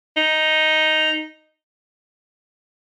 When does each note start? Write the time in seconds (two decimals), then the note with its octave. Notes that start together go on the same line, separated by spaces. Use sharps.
0.17 D#4